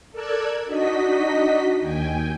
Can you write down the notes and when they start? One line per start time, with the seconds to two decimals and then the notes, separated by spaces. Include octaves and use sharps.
0.11 A4 A#4 D5 E6 F#6 G#6
0.65 D4 D#4 F#4 D#5 B6
1.80 D#2 G5 G#5